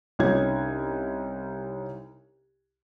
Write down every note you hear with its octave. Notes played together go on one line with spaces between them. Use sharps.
C2 C#4 D#4 G#6